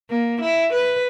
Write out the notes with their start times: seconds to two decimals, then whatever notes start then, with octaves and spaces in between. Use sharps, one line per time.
0.10 A#3
0.41 E4
0.72 B4